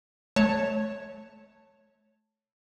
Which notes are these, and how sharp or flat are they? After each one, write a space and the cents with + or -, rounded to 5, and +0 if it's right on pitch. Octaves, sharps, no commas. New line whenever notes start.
A3 -30 C#5 +0 A5 +15